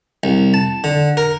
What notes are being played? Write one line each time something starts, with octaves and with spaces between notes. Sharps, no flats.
C2
A5
D3
A#4